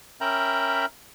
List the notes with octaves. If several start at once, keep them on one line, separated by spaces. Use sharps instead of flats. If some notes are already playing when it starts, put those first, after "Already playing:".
C#4 A#4 E5 G5 A#5 B5